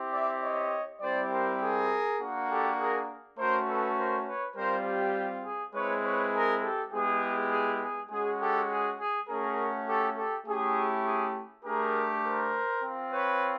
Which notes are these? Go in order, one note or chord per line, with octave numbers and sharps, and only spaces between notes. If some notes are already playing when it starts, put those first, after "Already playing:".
Already playing: C4 E4 G4
D5 E5
C#5 D#5
G3 C4 E4 G4 C5 D5
A#4 C5
G#4 A#4
A#3 D4 F#4
G4 A4
G#4 A#4
A3 C#4 F#4 A#4 C5
A4 B4
A#4 C5
B4 C#5
G3 C4 F4 A#4 C5
G4
G#4
G#3 C4 E4 B4 C#5
B4 C#5
G#4 A#4
G4 A4
G#3 B3 E4 G4 G#4
G#4
G#4
G#3 C#4 F#4 G#4
G4 A4
G#4
G#4
A3 C#4 F#4 G#4 A#4
G4 A4
G4 A4
A3 C#4 E4 G4 G#4
G#4
A3 D4 G4 G#4 A#4
A#4 C5
C4 F4
B4 C#5